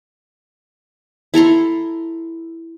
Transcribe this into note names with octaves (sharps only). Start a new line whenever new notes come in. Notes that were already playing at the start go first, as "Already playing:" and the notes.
E4 A4 A#5 C6